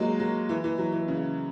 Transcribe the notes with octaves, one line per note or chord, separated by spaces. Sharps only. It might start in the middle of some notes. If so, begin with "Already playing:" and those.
Already playing: F#3 G#3 A#3 D#4
F#3
E3
E3
F#3
E3
C#3